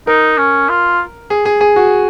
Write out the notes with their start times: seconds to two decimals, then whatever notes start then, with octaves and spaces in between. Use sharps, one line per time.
0.07 D#4 A#4
0.38 C#4
0.69 F4
1.30 G#4
1.45 G#4
1.61 G#4
1.76 F#4